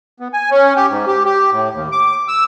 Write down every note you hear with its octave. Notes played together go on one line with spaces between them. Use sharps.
B3
G#5
C#4
G4
G#2
G4
G4
A2
D#2
D6
E6